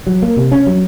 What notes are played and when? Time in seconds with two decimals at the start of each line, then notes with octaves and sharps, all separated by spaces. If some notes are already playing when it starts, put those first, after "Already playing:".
0.07 F#3
0.22 A#3
0.37 C3
0.52 C#4
0.67 F#3